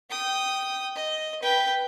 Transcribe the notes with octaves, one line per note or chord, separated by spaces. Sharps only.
G5 D#6
D#5
B4 G5